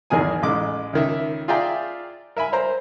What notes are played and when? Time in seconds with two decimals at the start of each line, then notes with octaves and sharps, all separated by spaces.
0.10 G#1 E2 D#3 A#3 G#4 G#5
0.42 A1 G#3 D6
0.93 C#2 D#3 E5
1.48 F4 G#4 D5 E5 G5 A#5
2.36 A#4 E5 G#5 B5
2.52 A#4 C5 A#5